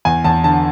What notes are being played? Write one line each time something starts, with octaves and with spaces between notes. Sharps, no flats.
E2 G#5
E2 A5
D3 A5